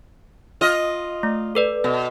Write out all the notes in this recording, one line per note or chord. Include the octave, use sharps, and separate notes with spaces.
F4 D#5
A3
A4 B4 D5
B2